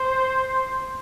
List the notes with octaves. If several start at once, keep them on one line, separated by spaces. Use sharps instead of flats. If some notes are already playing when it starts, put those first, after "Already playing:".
Already playing: C5